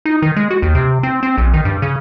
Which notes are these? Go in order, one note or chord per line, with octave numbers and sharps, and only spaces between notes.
D#4
D#3
G#3
F#4
D#2
C3
C4
C4
A#1
D#3
G2
C#3